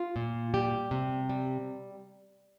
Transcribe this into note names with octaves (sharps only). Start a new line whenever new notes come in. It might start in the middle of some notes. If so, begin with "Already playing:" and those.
Already playing: F4
A#2
G3 G4
C3
G3